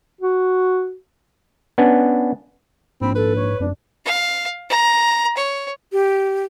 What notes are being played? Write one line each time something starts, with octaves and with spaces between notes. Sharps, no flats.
F#4
B3 C#4 D4 B4
A#1 G#2 C4 B5
A4 B4
C#5
F1 F#2 D4
F5
A#5
C#5
G4